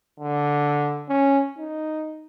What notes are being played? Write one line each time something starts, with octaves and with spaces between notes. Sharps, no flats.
D3
C#4
D#4